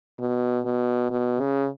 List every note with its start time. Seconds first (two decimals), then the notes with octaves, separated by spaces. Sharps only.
0.19 B2
0.65 B2
1.10 B2
1.40 C#3